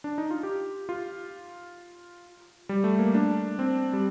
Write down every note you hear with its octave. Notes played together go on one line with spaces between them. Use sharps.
D4
D#4
F4
G4
F4
G3
A3
A#3
D4
C4
G3